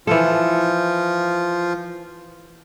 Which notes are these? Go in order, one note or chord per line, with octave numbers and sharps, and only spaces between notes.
E3 F3 F4 A4